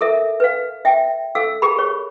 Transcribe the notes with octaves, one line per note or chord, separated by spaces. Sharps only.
A4 A#4 E5
B4 F5
E5 G5
A4 F5 E6
G4 G#4 A#4 B5
C#5